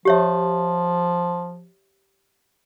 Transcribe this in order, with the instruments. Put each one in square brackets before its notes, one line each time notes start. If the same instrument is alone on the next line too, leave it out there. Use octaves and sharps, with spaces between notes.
[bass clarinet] F3 [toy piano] G4 C#5 E5